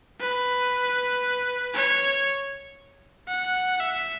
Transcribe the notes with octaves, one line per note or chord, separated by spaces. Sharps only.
B4
C#5
F#5
E5